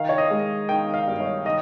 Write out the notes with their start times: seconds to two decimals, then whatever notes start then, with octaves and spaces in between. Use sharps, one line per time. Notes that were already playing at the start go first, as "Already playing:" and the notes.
Already playing: D#3 F5
0.09 C#5
0.18 D#5
0.31 G#3
0.69 D#3 G5
0.94 F5
1.07 G2
1.20 C#5
1.45 D#3 D#5